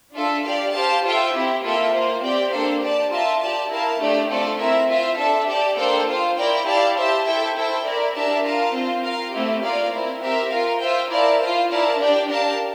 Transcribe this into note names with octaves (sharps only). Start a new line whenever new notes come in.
D4 F4 A4 E5
G4 D5 F5
G4 C5 F5 A5
F4 A4 C5 E5 G5
C4 E4 G4
A#3 F4 A4 E5 G5
A#3 F4 C5
C4 G4 D5 G5
A#3 D4 A4 C5 F5
G4 D5 A5
F4 A#4 E5 A5
G4 D5 A5
E4 A#4 F5 A5
A3 D4 G4 D5
A3 C4 F4 A4 D5
C4 E4 A#4 E5
F4 C5 E5
D4 A4 E5 A5
G4 D5 A5
A#3 D4 A4 C5 G5
F4 C5 F5
E4 A#4 D5 G5
E4 G4 D5 F5 A5
G4 C5 E5 A5
E4 A4 E5 G5
E4 A4 C5 G5
E4 A#4 D5
D4 G4 A#4 E5 A5
F4 A#4 F5 A5
C4 F4 C5
F4 A#4 F5
A3 C4 E4 G4
A#3 F4 A#4 D5 F5
C4 E4 A#4
C4 G4 A#4 E5
F4 A#4 F5
F4 C5 E5 G5
E4 A#4 D5 F5 A5
F4 C5 F5
E4 A#4 D5 F5 A5
D4 G4 D5 G5
D4 G4 A#4 F5 A5